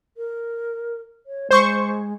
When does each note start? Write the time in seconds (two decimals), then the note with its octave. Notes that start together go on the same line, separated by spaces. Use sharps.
0.17 A#4
1.26 C#5
1.51 G#3 C5 C#6